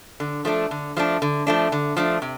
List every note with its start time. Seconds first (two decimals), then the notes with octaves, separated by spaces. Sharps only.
0.20 D3
0.45 F3 A3 D4
0.71 D3
0.97 F3 A3 D4
1.22 D3
1.47 F3 A3 D4
1.72 D3
1.97 F3 A3 D4
2.22 C3